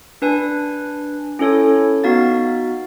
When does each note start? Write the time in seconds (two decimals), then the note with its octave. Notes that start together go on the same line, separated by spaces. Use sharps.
0.22 D4 B4 G#5
1.39 C#4 E4 A4 C#5
2.04 B3 D#4 F#4 F5 A6